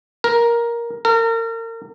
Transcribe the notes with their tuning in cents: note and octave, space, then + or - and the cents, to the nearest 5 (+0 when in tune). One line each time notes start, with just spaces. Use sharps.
A#4 +10
A#4 -35